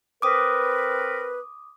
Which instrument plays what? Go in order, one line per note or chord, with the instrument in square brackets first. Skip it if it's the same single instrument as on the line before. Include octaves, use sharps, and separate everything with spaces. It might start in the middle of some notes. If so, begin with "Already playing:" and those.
[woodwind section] C4 A#4 B4 [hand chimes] D6 D#6